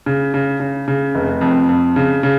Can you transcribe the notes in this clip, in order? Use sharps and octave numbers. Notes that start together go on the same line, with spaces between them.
C#3
C#3
C#3
C#3
F1
F2
F2
C#3
C#3